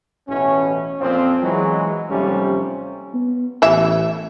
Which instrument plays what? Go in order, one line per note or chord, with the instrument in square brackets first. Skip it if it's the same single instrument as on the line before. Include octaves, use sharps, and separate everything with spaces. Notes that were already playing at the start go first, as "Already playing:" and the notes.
[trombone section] A1 B2 E3 C#4
F2 A#2 F3 C4
E3 F#3 G#3
D#2 C3 F3 G3 A3 C#4
[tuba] B3
[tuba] A1 [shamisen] E3 E5